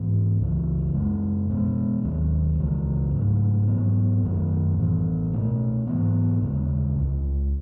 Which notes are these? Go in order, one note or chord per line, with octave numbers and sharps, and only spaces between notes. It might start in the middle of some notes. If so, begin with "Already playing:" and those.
Already playing: G#2 E3 B3
C#2 C#3 E3
F#2 C#3 G#3 C#4
B2 G#3 B3
D#2 D#3 F#3 C#4
C#2 C#3 E3 G#3
G#2 F#3 A3
G#2 F#3 B3
F#2 D#3 F#3 A3
A2 E3 B3
B2 A3 C#4
G#2 E3 B3
D#2 C#3 G#3
C#2 C#3 G#3